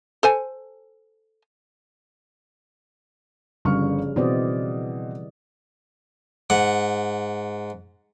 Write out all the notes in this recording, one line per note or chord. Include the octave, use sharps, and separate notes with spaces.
A4 C5 G#5
G1 C#3 F3 G3 C#6 F6
B2 E3 C4 D5 D#5
G#2 F#5